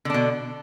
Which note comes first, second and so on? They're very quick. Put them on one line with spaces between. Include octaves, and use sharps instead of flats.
D3 D4 B2